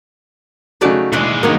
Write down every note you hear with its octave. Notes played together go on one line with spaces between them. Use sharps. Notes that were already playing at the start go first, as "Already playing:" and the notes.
C#3 F#3 A3 D#4 F#4 D5
D#2 B2 E3 G#3 D4
D#3 F#3 A#3 B3 D#4